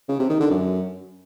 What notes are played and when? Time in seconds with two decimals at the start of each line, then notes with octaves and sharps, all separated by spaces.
0.09 C#3
0.19 C3
0.30 D#3
0.40 D3
0.50 F#2